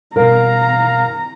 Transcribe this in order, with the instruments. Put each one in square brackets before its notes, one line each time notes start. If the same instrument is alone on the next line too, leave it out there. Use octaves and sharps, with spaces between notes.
[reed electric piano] G2 B2 [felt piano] A#4 [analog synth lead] F5 [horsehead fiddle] A#5